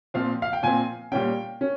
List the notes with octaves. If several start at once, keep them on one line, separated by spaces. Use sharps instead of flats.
A#2 F3 C4 F5
F5
G5
A#2 F3 C4 G#5
A#2 G3 C#4 G5
C#4